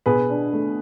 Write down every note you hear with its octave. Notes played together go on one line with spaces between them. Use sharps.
B2 G#4 B4
D4
A3